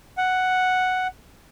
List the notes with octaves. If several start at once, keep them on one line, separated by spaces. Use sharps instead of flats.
F#5